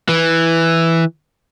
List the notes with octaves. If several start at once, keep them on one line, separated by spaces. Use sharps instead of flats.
E3